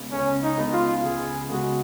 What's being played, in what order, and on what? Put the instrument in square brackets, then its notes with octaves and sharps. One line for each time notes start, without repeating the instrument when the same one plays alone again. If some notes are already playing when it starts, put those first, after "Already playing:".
Already playing: [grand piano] C#2 C#3 G#3 B3
[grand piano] C#2 [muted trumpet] C#4
[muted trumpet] D#4
[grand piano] C#3 G#3 B3
[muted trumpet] F4
[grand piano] C#2 [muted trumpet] G#4
[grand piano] C#3 G#3 B3 [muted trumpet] F#4